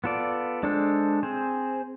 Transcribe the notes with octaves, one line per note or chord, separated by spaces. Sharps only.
B3 F4 A4 D5
G#3 D4 A4 C5
C4 G#4 C5